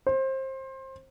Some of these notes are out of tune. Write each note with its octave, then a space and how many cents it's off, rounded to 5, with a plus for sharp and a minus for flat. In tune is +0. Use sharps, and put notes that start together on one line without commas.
C5 +25